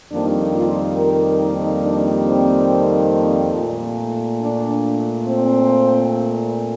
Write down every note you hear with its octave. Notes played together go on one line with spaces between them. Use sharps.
F2 D#3 G3 A#3 D4
F4
A#4
D#4
D4
C4
A#2 A3
D4
C4